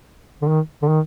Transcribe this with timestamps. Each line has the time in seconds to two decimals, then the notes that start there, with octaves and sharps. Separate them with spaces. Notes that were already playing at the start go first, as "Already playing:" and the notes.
0.42 D3
0.48 D#3
0.82 D3
0.88 D#3